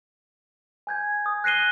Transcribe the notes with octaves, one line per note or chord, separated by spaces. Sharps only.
G#5 G6 G#6
D#6
F#6 A#6 C7 D#7 G7